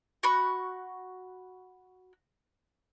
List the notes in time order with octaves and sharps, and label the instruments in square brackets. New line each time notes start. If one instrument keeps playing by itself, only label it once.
[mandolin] F#4 F#5 B5 C#6